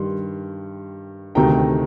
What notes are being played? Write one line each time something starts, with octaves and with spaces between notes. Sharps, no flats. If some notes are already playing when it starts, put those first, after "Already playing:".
Already playing: G2 D#3 G3 C6
D2 C3 D#3 A3 D#4 G5 A#5